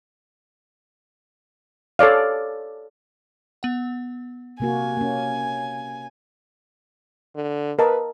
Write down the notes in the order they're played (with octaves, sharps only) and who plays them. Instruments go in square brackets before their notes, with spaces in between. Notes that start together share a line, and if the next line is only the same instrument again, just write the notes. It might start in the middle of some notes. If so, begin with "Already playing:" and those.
[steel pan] A4 C#5 D5 F5
[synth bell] B3 F#5
[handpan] C3 A#3 F#4 [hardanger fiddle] G#5
[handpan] A#3 C#4
[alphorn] D3
[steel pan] A#4 D#5 A5 [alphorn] B4